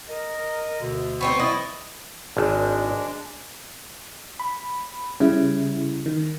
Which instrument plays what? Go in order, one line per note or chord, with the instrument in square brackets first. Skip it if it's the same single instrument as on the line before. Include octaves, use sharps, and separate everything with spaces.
[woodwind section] A#4 D#5
D2 B2 D3
[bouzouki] B3 C4 D#4 [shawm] C#6
[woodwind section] E3 F#3 D5 [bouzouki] E4 [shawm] D#5
[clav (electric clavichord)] G#1 [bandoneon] G#3 D4
[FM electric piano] B5
C#3 G3 E4
D#3